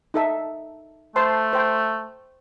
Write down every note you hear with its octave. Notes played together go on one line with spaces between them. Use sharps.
D#4 A4 E5
A3 C5 A5 C6
C5 G5